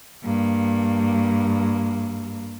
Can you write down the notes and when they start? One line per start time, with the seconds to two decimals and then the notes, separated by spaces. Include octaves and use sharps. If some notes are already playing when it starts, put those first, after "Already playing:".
0.24 G2 A#3